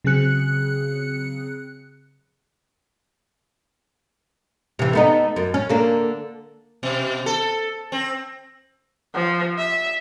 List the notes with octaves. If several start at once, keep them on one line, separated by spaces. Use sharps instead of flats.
C#3 F#3 C4 G#4 F#6 C#7
C3 E3
A3 B3 D#4
F#2
C#4
D3 A#3
B2
A4
C4
F3
E5